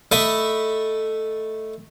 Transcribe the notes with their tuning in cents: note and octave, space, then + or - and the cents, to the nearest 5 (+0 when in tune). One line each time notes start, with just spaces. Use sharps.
A3 +0 D#5 +0 B5 +0